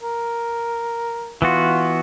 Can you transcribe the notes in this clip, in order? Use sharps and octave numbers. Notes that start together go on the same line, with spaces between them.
A#4
E3 B3 F4 F#4